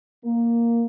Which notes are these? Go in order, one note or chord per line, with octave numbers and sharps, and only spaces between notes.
A#3